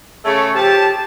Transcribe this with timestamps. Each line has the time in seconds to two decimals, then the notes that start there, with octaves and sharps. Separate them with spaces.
0.25 C#3 A3 C#5
0.54 F3 G4 F5 A5